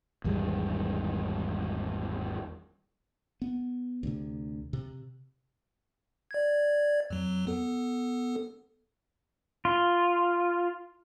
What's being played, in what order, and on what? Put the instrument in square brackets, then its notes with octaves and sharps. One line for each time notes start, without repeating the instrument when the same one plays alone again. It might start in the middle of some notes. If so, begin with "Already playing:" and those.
[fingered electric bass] G#1 E2 G3 G#3
B3
D2 C3
C3
[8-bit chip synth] D5 G#6
F2 F#3
B3 A4
[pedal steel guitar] F4